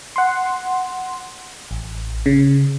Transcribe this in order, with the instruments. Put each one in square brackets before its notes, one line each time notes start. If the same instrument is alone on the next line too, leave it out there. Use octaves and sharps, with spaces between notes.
[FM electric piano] F#5 C6
A1
C#3